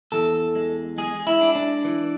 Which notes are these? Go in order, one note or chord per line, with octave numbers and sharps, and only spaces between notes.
E2 A4
G#3
G#3 G#4
E4
D4
D4
E3